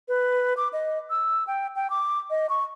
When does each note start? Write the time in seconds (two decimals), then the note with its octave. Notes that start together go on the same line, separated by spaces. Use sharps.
0.08 B4
0.57 D6
0.73 D#5
1.10 E6
1.47 G5
1.76 G5
1.90 D6
2.30 D#5
2.49 C#6